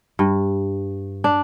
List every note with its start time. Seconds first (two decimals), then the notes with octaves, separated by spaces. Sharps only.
0.19 G2
1.24 D4